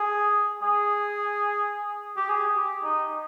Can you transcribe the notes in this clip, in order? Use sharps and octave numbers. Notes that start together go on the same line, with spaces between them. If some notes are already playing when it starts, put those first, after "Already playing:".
Already playing: G#4
G#4
G4
G#4
G4
D#4